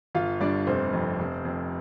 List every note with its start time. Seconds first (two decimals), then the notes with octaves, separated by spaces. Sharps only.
0.15 G1 F4 F5
0.41 G2 D4 D5
0.67 F1 C4 C5
0.93 F2
1.19 F1
1.45 F2